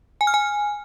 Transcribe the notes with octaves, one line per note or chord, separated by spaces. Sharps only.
G#5
F6
G#5